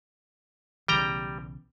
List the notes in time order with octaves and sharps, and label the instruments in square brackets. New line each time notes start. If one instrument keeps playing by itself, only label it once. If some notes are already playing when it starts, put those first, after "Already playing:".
[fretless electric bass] B1 C#3 E3 [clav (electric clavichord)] G3 G5 A#5